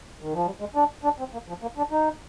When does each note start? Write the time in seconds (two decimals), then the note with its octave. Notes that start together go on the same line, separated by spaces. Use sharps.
0.21 D#3
0.34 F3
0.46 G3
0.60 G#3
0.75 D4
1.04 D4
1.19 C4
1.33 A#3
1.49 F3
1.62 A#3
1.78 D4
1.91 D#4